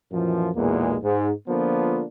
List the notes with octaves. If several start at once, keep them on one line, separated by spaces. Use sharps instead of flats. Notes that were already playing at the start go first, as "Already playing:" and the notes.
F#2 A#2 E3 F3
B1 E2 A#2 G#3 A#3
G#2
D3 F3 A#3 B3 D4 F4